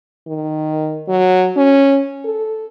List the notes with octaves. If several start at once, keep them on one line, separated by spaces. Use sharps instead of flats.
D#3
F#3
C#4
A4